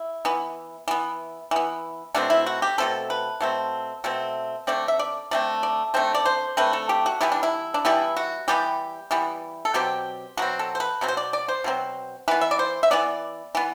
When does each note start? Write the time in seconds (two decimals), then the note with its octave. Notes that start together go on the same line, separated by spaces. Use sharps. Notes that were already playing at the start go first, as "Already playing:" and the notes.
Already playing: E4
0.25 E3 B3
0.88 E3 B3
1.51 E3 B3
2.14 B2 A3 C4 D4
2.30 E4
2.46 F#4
2.62 G4
2.78 B2 A3 C4 A4
3.10 B4
3.41 B2 A3 C4
4.04 B2 A3 C4
4.67 D3 A3 C4 D5
4.88 E5
4.99 D5
5.31 D3 A3 C4 D5
5.63 D5
5.94 D3 A3 C4 C5
6.15 D5
6.25 C5
6.57 D3 A3 C4 B4
6.73 A4
6.89 G4
7.06 F#4
7.21 E3 G3 B3 E4
7.32 D4
7.43 E4
7.74 D4
7.85 E3 G3 B3 E4
8.17 F#4
8.48 E3 G3 B3 G4
9.11 E3 G3 B3
9.65 A4
9.74 B2 F#3 C4 G4
10.37 B2 F#3 C4 F#4
10.59 A4
10.75 C5
10.80 B4
11.01 B2 F#3 C4
11.08 C5
11.17 D5
11.33 D5
11.48 C5
11.64 B2 F#3 C4
12.28 E3 B3 B4
12.41 E5
12.51 D5
12.59 C5
12.83 E5
12.91 E3 B3 D5
13.55 E3 B3